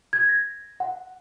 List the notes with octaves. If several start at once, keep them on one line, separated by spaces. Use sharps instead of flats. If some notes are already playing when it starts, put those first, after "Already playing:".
G#6
A#6
F#5